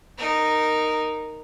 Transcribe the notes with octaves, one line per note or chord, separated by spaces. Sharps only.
D#4 A#4